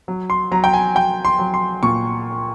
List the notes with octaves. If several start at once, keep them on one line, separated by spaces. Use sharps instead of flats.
F#3
C6
F#3 A#5
G5
G#5
F#3 G5
C6
F#3
C6
A#2 C#6